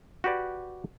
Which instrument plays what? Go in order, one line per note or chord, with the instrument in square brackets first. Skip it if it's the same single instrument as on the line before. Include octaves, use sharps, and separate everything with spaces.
[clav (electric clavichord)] F#4 G4 B4 D5